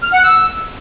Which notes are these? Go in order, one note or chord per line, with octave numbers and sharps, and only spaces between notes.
F6
F#5
E6